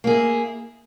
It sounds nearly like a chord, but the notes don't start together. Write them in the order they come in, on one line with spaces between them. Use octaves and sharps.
A#3 G#4 E4